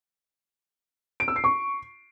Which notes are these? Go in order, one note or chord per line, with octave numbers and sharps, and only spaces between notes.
D7
E6
C7
C#6